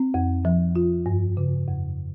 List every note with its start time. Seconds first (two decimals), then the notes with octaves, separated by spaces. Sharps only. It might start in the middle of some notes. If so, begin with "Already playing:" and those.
Already playing: C4
0.14 F2
0.45 F3
0.75 F4
1.06 G2
1.37 C#3
1.68 F2